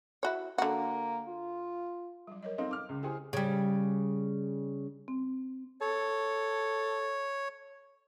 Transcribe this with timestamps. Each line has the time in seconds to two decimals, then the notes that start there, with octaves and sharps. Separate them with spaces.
0.23 E4 F#4 C#5
0.58 D3 A#3 F#4
1.28 F4
2.27 F#3 G3
2.43 A#4 C#5 D#5
2.58 C4 D#4 A4 F5
2.71 D6 F6
2.89 C#2
3.03 E4 G4 G#4 C5 G5
3.33 C#3 G3
5.08 C4
5.81 A4 C#5